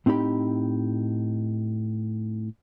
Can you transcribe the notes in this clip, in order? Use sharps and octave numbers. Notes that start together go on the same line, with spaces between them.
A2 C4 D#4 G4 B5